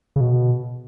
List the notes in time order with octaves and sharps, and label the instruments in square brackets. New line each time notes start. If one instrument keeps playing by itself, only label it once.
[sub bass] C#3
B2